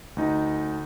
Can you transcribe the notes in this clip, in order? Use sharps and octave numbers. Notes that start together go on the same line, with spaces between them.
D2 D#4